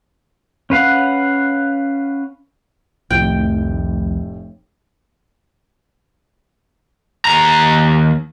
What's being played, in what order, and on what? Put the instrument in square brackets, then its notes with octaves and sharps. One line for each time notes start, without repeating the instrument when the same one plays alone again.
[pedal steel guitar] C#4 B4 F5 F#5
[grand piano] F1 A2 [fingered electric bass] C2 F2 D#3 [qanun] G5
[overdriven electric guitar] D#2 A#5